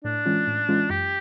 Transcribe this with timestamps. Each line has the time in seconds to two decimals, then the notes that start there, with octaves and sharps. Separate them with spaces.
0.04 A2 D4
0.26 E3 G#3 C#4 F4
0.47 A2
0.69 E3 G#3 C#4 F4
0.90 F#2 G4